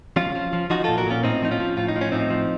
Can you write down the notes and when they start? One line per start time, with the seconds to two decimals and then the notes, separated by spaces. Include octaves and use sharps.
0.16 F3 C#4 F4
0.35 F3
0.53 F3
0.70 F3 D#4 F#4
0.84 A#2 F4 A4
0.98 F#4 A#4
1.06 A#2 C#4 F4
1.23 A2 C4 D#4
1.42 F3 D#4
1.51 C#4 F4
1.60 F3
1.77 A2 F4
1.88 D#4
1.96 F3
2.01 C#4
2.12 A2 C4 D#4
2.30 F3